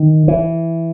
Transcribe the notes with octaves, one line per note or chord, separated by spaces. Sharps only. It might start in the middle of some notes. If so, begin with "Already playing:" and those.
Already playing: D#3
E3